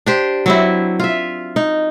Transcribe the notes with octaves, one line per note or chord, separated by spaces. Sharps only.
D4 G4 C5
F#3 C4 E4
F4 E5
D#4